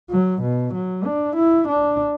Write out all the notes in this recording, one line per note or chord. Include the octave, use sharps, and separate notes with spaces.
F#3
B2
F#3
D4
E4
D4